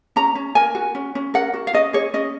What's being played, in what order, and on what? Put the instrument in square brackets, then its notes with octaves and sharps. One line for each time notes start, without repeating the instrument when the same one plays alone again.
[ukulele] C#4 A#5
C#4
A#4 G#5
F#4
C#4
C#4
A#4 F#5
F#4
F5
C#4 D#5
G#4 C#5
C#4 D#5